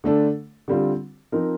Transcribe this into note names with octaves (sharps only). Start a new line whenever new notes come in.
D3 A3 D4 A4
D3 G3 C4 F4
F3 C4 D#4 A#4